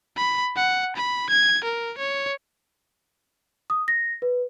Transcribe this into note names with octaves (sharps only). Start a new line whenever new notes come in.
B5
F#5
B5
G#6
A#4
C#5
D#6
A#6
B4